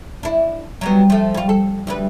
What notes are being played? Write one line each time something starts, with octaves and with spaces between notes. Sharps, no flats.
D4 E4
F#3 G3 B3
F3 A3
G3 F4
A4
D2 G3 B4